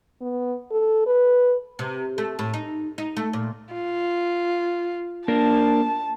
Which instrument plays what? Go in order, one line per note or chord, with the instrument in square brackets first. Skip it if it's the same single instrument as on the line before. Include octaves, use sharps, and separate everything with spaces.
[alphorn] B3
A4
B4
[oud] C3
A3
A2
D#4
D#4
A3
A#2
[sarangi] F4
[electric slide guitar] A#3 D4 A#4 [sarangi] A5